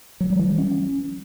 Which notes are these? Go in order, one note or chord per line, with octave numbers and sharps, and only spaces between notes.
F#3
G3
E3
G3
C#4